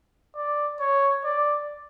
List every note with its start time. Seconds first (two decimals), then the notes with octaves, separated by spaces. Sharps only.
0.35 D5
0.80 C#5
1.25 D5